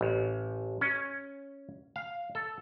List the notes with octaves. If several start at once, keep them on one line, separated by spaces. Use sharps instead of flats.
A1
C#4
F5
A4